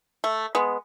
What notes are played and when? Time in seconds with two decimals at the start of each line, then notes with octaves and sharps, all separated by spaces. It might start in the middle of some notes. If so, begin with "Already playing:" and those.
0.24 A3
0.55 G#3 B3